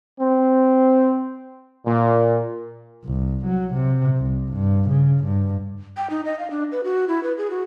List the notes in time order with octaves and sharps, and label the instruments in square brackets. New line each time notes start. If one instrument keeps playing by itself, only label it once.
[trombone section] C4
A#2
[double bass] C2
F#3
C3
C2
G2
C#3
G2
[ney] G5
D#4
D#5
F5
D4
B4
F#4
E4
B4
G#4
F#4